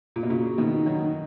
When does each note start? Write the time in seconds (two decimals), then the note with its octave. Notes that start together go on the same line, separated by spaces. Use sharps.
0.16 A#2
0.23 B2
0.30 A#2 C#3 F#4
0.58 B2 D#3
0.72 D#4
0.86 D#3 F#3